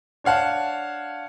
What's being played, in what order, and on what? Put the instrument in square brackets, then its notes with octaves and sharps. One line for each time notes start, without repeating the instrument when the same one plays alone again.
[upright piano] D4 C#5 F5 F#5 A5